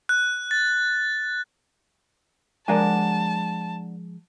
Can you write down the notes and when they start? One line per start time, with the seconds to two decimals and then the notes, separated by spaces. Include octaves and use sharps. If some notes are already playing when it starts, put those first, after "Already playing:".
0.09 F#6
0.51 A6
2.68 F3 G#3 D4 A#4 F#5 G#5 A5